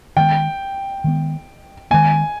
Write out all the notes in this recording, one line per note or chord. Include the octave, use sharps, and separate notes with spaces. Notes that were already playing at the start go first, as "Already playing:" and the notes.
D#3 G#3 B3 G5
D#3 G#3 B3
D#3 G#3 B3 G#5